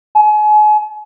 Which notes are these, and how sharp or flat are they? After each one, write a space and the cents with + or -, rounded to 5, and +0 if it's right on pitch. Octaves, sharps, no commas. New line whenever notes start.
G#5 +35